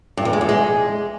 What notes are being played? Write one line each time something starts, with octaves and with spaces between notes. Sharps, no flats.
G2
E2
G#3
E2
G#3